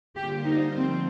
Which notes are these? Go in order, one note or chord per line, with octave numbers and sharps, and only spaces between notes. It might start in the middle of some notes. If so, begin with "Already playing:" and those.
D3 G3 A#3 F4 G4 C5
D#4
D3 F3 A3 C4